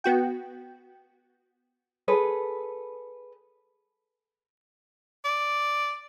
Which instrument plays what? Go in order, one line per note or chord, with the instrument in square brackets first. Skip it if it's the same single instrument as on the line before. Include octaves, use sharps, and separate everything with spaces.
[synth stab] B3 F#4 G5
[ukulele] G#4 A4 B4
[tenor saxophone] D5